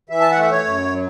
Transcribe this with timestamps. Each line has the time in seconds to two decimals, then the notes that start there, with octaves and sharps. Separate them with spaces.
0.09 E3 E5
0.21 A5
0.31 F#5
0.36 A3 E5
0.51 C#5
0.65 F#2
0.92 F#3